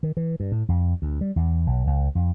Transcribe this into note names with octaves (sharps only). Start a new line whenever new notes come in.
D#3
E3
G2
A2
F2
D2
G3
E2
B1
C#2
F2